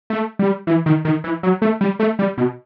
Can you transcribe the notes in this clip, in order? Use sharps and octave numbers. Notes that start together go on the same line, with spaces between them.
A3
G3
E3
D#3
D#3
E3
F#3
A3
G3
A3
G3
B2